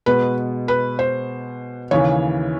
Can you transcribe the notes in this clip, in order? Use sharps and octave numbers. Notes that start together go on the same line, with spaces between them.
B2 G#3 B3 B4
B4
C5
D#2 C#3 E3 C#5